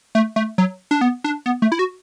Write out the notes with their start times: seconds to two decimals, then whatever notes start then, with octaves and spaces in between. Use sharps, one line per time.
0.15 A3
0.36 A3
0.58 F#3
0.91 D4
1.01 B3
1.24 D4
1.46 B3
1.62 A3
1.72 E4
1.79 F#4